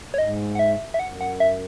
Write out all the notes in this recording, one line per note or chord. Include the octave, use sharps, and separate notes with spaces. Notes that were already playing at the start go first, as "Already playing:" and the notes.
F#2 C#5
G#2 D#5
F#5
E5
E5
F#2 F#5
F#5
E5